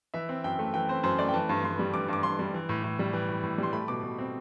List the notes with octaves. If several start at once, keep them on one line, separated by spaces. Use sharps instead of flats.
E3 E5
C4
F#2 G5
A3
E3 G5
C4 C5
F#2 C5
A3 D5
G5
E3 A5
G2
G2 C6
G3
E3 D6
G2 D6
G2 C6
G3
E3
A2
A2
G3
E3
A2
A2
G3 C6
A3 B5
B2 D6
B2
C4